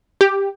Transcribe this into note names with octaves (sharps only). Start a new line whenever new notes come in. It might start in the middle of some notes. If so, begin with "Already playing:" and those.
G4